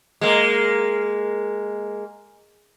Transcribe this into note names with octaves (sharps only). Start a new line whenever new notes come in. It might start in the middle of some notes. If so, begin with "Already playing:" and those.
G#3 A#3